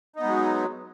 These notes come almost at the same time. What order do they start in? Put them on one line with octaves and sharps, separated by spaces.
D#4 B3 G#3 F#3